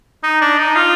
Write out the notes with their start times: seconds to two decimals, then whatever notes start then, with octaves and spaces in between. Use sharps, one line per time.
0.23 D#4
0.41 D4
0.58 D#4
0.75 F4